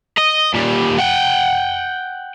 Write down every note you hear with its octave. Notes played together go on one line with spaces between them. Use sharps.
D#5
A#2 G3
F#5 G5